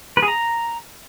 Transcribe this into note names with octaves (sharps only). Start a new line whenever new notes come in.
B4
G#4
A#5